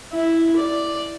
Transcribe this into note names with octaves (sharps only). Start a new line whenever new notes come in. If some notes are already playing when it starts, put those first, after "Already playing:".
E4
D5